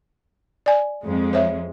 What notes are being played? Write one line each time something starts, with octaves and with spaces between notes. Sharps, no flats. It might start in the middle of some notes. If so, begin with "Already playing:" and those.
D5 G#5
F2 G#3
C5 C#5 E5